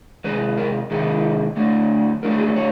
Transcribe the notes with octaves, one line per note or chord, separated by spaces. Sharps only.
C3 D#3 G#3 B4
A#4
C3 D#3 G#3 A4
D3 F#3 A3
D3 F#3 A3 A#4
A4
G#4
A4
C#5